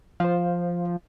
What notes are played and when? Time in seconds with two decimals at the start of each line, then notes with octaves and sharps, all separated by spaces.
0.20 F3 C5 F5